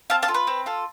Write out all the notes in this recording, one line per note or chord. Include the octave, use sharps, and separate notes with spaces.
C4 F5 A5
F5 A5
F4 A4
B4
C4
F4 A4